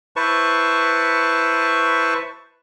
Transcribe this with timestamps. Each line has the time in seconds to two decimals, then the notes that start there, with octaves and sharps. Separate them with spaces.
0.16 E4 B4 C5 A5 C#6